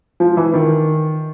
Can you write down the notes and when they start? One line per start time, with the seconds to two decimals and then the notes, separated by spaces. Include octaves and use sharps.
0.20 F3
0.37 E3
0.54 D#3